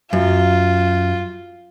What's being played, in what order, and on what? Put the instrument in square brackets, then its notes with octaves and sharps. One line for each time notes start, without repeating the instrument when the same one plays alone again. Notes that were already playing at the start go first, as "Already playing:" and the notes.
[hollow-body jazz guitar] F#2 [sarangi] F4